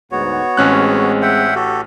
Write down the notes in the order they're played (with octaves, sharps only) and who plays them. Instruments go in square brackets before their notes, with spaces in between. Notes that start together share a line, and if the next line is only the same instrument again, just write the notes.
[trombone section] D2 G#2 [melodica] B3 F#4 C#5
[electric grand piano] A1 C#4 F#6 [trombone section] G#3 C4
[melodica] E5 F#5 G5
F#4 G4 A4